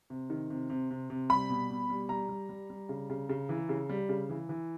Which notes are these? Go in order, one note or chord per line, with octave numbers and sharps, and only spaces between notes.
C3
D#3
C3
C3
C3
C3
G3 B5
B2
B2
G3
G3 A#5
G3
G3
G3
C#3
C#3
C#3
E3
C#3
G3
C#3
E3
E3